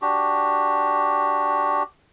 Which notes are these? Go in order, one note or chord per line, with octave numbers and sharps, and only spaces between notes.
D4 F#4 G4